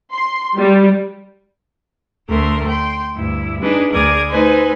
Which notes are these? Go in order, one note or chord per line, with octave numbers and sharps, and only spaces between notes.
C6
G3
D2 A3 A#4 C6
G5 C6
D2 G2 E4
D4 D#4 G#4 B4
D2 G#4 A#4 D5 D#6 G#6
A3 D#4 B4 C5 G#5